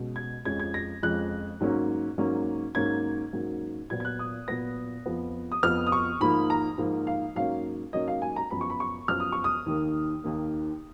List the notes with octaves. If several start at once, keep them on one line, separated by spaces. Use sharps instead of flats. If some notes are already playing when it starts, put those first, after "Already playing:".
Already playing: B2 G#3 C#4
G#6
F2 F3 G#3 C#4 G#6
G#6
A#6
F2 F3 G#3 C#4 F#6
G#2 F#3 A#3 C#4
G#2 F#3 A#3 C#4
G#2 F#3 A#3 C#4 G#6
G#2 F#3 A#3 C#4
A#2 F#3 B3 G#6
G#6
F#6
D#6
A#2 F#3 B3 A#6
F2 F3 B3
D#6
F2 F3 B3 F6
D#6
C#6
G#2 F3 A#3 B5
A#5
G#2 F3 A#3
F5
G#2 F#3 A#3 C#4 F5
G#2 F#3 A#3 C#4 D#5
F5
G#5
A#5
F#2 F3 B3 B5
C#6
B5
C#6
F#2 F3 B3 F6
D#6
C#6
D#6
D#2 D#3 A#3
D#2 D#3 A#3